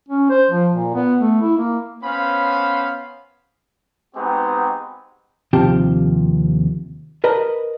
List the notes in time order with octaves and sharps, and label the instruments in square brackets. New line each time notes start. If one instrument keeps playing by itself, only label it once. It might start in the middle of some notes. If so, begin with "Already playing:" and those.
[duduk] C#4
C5
F3
A#2
B3
A3
E4
A#3
[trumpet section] B3 C#4 C5 F5 B5
G#3 B3 C4 D#4 F#4 G4
[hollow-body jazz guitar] D#2 C3 F3 G4 A5
A#4 B4 D#5 A5 A#5